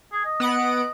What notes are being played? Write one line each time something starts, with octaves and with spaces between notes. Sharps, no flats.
G#4
D#5
B3 F#5 D7